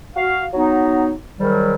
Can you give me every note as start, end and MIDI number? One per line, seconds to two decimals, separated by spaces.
0.15 0.44 66
0.15 0.44 77
0.54 1.12 54
0.54 1.12 59
0.54 1.12 63
1.40 1.74 44
1.40 1.74 51
1.40 1.74 54
1.40 1.74 55